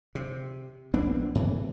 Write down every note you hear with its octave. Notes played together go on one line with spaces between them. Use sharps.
C3
A#1 B3 C4 D4
G#2 C3 E3